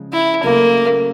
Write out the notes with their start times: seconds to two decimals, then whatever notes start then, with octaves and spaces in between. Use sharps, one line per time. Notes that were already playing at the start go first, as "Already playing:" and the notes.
Already playing: C#3 F3 G#3
0.13 E4
0.43 C#3 F#3 A3 A#3 C#4